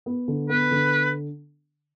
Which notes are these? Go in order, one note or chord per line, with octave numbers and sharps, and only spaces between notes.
B3
D3
B3 B4
D3